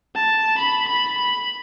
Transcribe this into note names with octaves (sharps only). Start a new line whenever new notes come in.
A5
B5
B5
B5